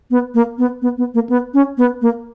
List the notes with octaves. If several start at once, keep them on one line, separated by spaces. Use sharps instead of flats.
B3
A#3
B3
B3
B3
A#3
B3
C#4
B3
A#3